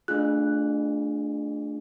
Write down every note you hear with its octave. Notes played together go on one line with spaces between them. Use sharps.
A3 D4 F4 G#4 F#6